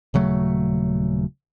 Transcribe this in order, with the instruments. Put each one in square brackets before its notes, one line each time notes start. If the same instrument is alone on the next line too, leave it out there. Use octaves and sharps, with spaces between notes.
[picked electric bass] D#1 C#3 F#3 A3